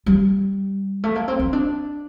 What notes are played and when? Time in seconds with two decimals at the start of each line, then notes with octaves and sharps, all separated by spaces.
0.06 G3
1.04 A3
1.15 A#3
1.28 C4
1.40 C4
1.53 D4